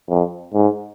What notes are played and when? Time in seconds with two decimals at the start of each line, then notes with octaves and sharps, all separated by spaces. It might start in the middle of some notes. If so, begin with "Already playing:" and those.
0.09 F2
0.54 G#2